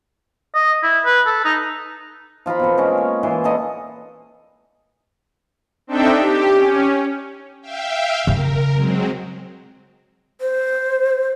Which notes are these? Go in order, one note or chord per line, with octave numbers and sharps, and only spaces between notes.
D#5
E4
B4
A4
D#4
F3 F4 A#5 B5
B2 C4 A4
G#3 A#3 C#4 A#4
C#5
E3 E4 F4 C6
A#2 A4 D#5
C4 D4 D#4 A4 E5 G5
G4
C#4
E5 F5 G5
C#3 A#4
F#3 G#3 C4
C5